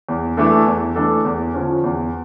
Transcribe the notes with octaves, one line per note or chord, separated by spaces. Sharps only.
E2
E3 A3 D4 A4
E2
E3 A3 D4 A4
E2
D3 F3 C#4
E2